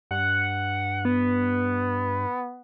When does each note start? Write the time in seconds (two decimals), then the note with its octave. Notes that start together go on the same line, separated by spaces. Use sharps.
0.11 G2 F#5
1.05 B3